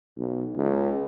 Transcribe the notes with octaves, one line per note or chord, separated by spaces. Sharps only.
B1
C#2